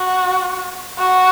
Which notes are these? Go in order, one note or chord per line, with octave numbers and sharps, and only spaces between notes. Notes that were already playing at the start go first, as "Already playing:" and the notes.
Already playing: F#4
F#4